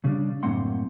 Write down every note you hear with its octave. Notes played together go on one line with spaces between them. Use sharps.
C#3 G3 D4
F#2 A2 A#3 C4 F#5 C6